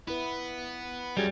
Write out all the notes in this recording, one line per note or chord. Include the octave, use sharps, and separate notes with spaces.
B3 E4 B4
F#2 F#3 G3 G#4 G#6